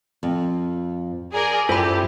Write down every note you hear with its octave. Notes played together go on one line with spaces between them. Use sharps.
F2
G#4 A#4 D5
F#2 E4 F4 G4 A4 C5 G5 B5